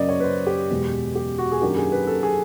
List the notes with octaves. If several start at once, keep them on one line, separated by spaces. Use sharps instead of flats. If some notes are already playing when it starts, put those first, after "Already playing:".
Already playing: F#2 C#3 F#3 A#3 D5 D#5
C#5
B4
C5
G4
E2 B2 G#3
G4
F#4
G#4
F#2 D#3 F#3 A#3 D4 G4
G#4
B4
A4
G#4